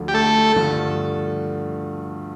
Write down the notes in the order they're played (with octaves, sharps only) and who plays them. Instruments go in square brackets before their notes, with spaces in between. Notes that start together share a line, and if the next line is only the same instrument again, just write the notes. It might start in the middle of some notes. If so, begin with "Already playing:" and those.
Already playing: [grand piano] D2 D3 F3
[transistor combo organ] G4
A3 A4
[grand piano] G2 D3 F3 A3